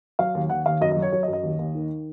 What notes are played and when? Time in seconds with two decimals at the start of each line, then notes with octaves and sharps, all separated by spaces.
0.19 F#3 F5
0.35 D#2
0.50 D#2 F#5
0.66 D#2 F5
0.81 F#2 D#5
0.92 D#5
0.97 F#3
1.02 C#5
1.12 F#3 C#5
1.23 D#5
1.28 F#2
1.33 D#5
1.43 D#2
1.59 D#2
1.75 D#3